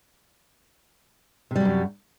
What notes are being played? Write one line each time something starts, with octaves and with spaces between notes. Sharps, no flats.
F#2 C3 F#3 G3